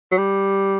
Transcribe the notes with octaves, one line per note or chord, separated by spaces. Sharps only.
F#3
G3